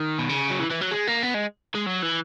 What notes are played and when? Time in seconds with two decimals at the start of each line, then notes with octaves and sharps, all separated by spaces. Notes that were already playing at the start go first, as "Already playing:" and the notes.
Already playing: D#3
0.19 B2
0.29 C#3
0.51 F#3
0.60 E3
0.71 E3
0.81 F#3
0.92 G#3
1.07 A#3
1.23 B3
1.34 G#3
1.75 G#3
1.86 F#3
2.02 E3